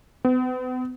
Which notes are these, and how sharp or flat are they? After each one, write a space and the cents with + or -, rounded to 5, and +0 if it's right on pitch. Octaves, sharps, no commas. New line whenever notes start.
B3 +45